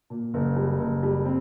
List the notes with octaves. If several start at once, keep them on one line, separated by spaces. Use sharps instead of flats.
A#2
F#1
G3
F#1
G3
C4